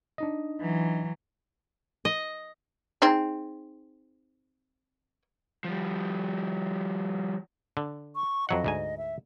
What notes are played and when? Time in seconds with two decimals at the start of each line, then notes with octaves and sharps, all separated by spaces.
0.18 D4 D#4 D#5
0.60 E3 F#3
2.05 D#5
3.02 C4 D#4 G#4
5.64 F3 G3
7.77 D3
8.16 C#6
8.49 F2 F#3 D#5 F#5
8.64 D2 G#2 G#5
8.98 E5